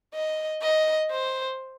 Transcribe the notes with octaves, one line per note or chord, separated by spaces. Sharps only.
D#5
D#5
C5